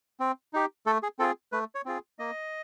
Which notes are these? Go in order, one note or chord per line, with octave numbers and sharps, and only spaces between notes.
C4
D#4 G4
A3 A4
G#4
C4 F4 G#4 A4
A3 B4
C#5
C4 F4 G#4
A#3 D#5